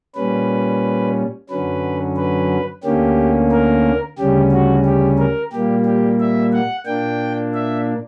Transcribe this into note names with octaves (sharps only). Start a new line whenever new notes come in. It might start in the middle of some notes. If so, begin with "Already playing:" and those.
A#2 G3 C#4 B4
F#2 D3 F#3 C#4 B4
B4
D2 D3 A#3 C#4 G4
A#4
D2 C#3 G3 C#4 G4
F#4
G4
A#4
A#2 G3 A#3 G4
G4
E5
F#5
A#2 A#3 D4 G5
E5